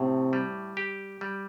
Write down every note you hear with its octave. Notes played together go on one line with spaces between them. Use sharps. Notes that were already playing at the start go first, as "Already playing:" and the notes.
Already playing: A2 C3
G3
G4
G3